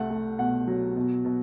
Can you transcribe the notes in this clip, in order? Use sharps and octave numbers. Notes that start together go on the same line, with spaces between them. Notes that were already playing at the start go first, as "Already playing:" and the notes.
Already playing: C2 A3 F#5
A3
B2 F#5
F#3
B2
B2